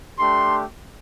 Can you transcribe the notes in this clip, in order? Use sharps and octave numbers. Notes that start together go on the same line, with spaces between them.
A3 D4 G4 C6